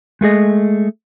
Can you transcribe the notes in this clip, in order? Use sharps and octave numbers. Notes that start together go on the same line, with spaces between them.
G#3 A3 G#4 D#5